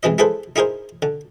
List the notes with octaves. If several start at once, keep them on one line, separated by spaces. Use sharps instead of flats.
G#2 C3 E3 E4 D#5
E4 G#4 A4 B4 C5
D#4 E4 G#4 A#4 C5
D3